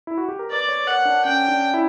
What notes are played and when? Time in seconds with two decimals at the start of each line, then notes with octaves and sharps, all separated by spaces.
0.07 E4
0.18 F#4
0.29 G4
0.39 A#4
0.50 B4 D5
0.69 C#5
0.87 A#4 F#5
1.05 D4
1.24 C#4 G5
1.48 D4
1.74 E4